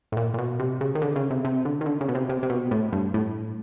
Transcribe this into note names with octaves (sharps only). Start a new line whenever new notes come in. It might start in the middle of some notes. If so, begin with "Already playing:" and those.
A2
A#2
A#2
B2
C3
C#3
D#3
D3
C#3
C3
C3
D3
D#3
D3
C#3
B2
C3
C3
C3
B2
A2
G2
A2